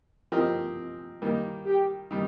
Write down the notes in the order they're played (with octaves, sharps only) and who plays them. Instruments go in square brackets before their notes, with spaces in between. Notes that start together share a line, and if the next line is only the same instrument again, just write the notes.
[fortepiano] F3 C4 G4 A#4 D#5
D#3 G3 A#3
[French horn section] G4
[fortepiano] D#3 G3